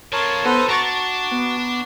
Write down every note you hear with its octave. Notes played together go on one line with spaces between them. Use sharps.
F2 F3 A#4 C#5 A5
B3 D#4 A4 B4 C5
D4 F#4 A#5 C#6 A6
B3